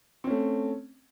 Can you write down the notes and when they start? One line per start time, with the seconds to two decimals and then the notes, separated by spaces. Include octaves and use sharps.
0.24 C4
0.27 C#4
0.30 A3